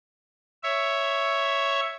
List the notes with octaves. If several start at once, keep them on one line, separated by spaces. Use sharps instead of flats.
C#5 E5